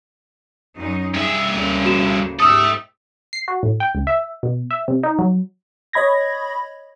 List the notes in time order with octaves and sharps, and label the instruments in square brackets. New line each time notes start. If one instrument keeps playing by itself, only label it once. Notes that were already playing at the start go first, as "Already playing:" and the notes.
[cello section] F#2 D#4
[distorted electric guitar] G2 E5 [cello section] G#4
[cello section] D2 C#3 A#3
[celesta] F#4 E7
[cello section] G#2 G4 [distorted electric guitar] A4 E5 [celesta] D#6 E6
[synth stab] C7
F#4
A2
G5
C#2
E5
B2
E5
C3
D#4
F#3
[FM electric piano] C#5 D#5 B5 G#6 A#6